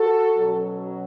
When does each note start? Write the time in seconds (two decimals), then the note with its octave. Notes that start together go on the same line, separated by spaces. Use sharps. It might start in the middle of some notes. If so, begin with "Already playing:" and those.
Already playing: F#4 A4
0.37 B2 F#3 C#4